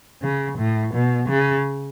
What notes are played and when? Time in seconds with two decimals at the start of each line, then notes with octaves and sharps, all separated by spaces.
0.22 C#3
0.58 A2
0.94 B2
1.29 C#3